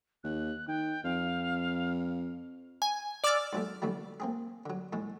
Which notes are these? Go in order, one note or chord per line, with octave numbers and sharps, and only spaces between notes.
D#2 F#6
D#3 G5
F2 F5
G#5
D5 D6 E6 F6 A6
G#2 F#3 A3
B2 D3 E3 F#3 A3
A#3 C4 G#4
D3 F#3
A2 E3 G#3